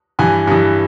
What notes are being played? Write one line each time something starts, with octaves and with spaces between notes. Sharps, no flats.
G2 E3 G#5
G2 E3